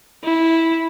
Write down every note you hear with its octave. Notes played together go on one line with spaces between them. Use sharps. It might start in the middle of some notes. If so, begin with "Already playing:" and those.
E4